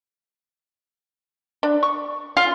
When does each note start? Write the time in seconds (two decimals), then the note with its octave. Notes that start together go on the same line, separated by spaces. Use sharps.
1.63 D4
1.83 C#6
2.37 F4 F5